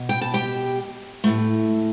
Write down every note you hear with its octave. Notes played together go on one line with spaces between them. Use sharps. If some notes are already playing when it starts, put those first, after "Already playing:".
Already playing: B2
G5
A5
G4 G5
A2 A3